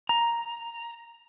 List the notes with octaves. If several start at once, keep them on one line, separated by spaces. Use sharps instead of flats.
A#5